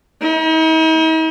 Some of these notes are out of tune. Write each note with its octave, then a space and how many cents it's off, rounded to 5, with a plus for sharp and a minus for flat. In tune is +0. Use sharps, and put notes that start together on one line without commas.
D#4 +45